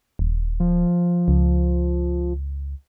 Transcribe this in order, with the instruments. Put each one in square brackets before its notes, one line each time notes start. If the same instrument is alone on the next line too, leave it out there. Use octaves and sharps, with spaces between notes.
[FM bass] D#1
[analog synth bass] F3
[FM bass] C#2